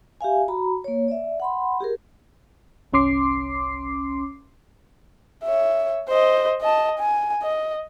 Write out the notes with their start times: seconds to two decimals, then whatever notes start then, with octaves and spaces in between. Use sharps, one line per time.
0.21 G4 E5 F5 G#5
0.48 F#4 A#5 B5
0.84 A#3 C#5
1.08 D5 E5
1.40 F#5 B5 C6
1.80 G4 G#4 A#4
2.93 G1 C2 C#4 C6 D6 C7
5.44 C#5 E5
6.08 C5 D#5
6.61 D#5 A5
6.99 G#5
7.42 D#5